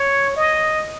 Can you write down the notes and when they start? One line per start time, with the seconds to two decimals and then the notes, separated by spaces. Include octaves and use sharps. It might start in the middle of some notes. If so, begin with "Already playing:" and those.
Already playing: C#5
0.36 D#5